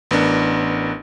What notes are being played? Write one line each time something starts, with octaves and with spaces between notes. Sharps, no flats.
A1 B3 D4 A#4